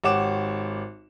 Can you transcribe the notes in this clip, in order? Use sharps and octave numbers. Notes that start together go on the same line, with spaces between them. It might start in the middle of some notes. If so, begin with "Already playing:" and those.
G#1 G4 C#5 F#5 D6 E7